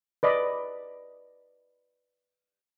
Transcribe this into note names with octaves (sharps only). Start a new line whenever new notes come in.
B4 D5 D#5 B5